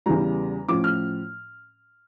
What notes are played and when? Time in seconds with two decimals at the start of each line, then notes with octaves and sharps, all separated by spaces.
0.06 E2 C#3 E3 G3 A#5
0.68 A2 F3 C#4 D6
0.84 F6